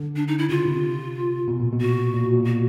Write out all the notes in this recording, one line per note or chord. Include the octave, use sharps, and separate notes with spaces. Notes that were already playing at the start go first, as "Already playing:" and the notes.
Already playing: D3
D4
D#4
E4
C#3 F4
C3
B2
A#2
B2
F#4
A#2
B2
A#2
B2 F#4